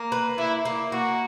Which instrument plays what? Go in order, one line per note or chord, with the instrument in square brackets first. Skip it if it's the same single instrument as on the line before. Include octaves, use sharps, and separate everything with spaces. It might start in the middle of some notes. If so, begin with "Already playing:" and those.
Already playing: [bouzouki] A#3
B4
[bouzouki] A#3 [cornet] E4
[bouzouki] A#3
[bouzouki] A#3 [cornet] F#4